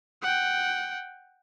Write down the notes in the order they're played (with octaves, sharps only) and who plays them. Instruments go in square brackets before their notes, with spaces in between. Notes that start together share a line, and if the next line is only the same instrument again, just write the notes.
[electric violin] F#5 G5